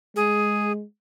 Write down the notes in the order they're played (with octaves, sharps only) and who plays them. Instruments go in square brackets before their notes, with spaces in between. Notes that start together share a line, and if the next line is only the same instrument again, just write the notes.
[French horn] G#3 [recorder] G#4